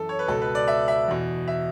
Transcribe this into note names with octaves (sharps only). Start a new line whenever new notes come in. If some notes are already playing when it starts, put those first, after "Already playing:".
Already playing: F#2 E3 A4
C#5
B4
C#2 B2 A4
B4
D5
E5
E5
E2 B2
E5